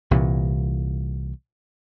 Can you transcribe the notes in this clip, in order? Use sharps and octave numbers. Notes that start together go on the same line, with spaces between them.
C2 A#2 E3